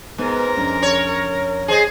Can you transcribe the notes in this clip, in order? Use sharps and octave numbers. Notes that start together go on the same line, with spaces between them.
G#2 B3 A#4
F2 C#4 D4
C#5
G#4 C5 D#5